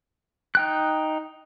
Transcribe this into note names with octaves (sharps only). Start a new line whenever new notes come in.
D#4 G5 F#6